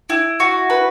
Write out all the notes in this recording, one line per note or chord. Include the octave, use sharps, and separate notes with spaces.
E4
F#4
B4